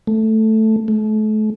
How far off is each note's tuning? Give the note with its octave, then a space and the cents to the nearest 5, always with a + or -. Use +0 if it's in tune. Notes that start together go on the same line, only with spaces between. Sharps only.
A3 +0
A3 -35